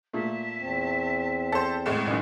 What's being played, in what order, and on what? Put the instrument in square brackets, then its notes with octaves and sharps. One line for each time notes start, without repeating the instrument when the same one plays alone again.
[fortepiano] A#2 A3 [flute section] E5 A5
[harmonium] E2 C4
[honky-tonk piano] A4 C5
C2 A2 G#3
[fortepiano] A1 F#2 D#3 [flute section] B4